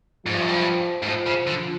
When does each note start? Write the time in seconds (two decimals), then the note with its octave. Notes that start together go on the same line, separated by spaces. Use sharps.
0.25 G#2 F3
0.34 G2
0.41 F#2
0.49 G2
1.02 G#2
1.06 A2 F3
1.26 C#3
1.47 D3 F3